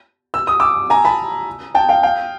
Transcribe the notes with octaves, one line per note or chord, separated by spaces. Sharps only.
E6
D#6
D6 E6
G#5 A#5
A5 B5
G5 A5
F5 G5
F5 G5